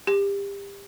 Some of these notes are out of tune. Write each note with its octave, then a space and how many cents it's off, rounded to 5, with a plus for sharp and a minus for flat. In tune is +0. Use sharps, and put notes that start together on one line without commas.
G4 +30